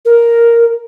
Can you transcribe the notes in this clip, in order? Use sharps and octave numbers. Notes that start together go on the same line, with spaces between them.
A#4